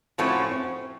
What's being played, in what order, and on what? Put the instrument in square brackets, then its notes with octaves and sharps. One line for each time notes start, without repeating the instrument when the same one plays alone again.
[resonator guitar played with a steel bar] A2 F3 A3 C#4 F#4 [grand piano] C4
[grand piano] C4